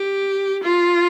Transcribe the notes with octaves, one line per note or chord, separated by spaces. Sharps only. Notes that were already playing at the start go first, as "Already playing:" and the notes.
Already playing: G4
F4